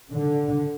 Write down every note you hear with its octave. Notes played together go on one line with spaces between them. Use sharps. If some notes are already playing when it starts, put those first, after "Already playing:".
D3